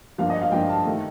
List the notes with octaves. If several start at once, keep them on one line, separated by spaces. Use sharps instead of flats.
G2 F3 A#3 F5
D#5
F5
G2 F3 A#3 G5
A5
D#3 A3